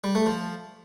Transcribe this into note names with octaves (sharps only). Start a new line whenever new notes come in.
G3
A3
F3